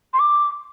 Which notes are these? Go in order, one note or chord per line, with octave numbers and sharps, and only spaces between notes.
C6
D6